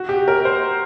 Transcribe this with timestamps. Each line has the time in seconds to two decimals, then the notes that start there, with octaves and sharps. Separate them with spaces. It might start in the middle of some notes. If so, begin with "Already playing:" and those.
Already playing: F#4
0.09 G4
0.28 A#4
0.45 C5